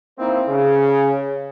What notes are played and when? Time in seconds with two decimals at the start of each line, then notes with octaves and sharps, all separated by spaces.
0.18 A#3 C4 D#4 E4 C5
0.48 C#3